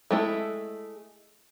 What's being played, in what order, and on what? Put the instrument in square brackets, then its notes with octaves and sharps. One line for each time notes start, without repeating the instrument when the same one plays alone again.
[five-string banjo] G#3 A3 E4